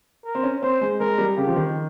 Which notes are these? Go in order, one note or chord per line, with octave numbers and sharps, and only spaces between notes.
A#4
C4
C#4
C4 C5
G#3
G#3 A#4
G3
C#3 G4
F3
D#3